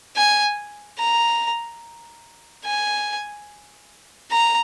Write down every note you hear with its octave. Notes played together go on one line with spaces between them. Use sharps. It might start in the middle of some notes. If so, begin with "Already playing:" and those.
G#5
A#5
G#5
A#5